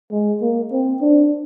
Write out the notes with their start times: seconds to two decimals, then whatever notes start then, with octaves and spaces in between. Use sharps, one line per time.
0.12 G#3
0.42 A#3
0.72 C4
1.01 D4